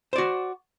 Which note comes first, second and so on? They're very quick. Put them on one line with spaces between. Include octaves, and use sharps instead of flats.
C5 D5 F#4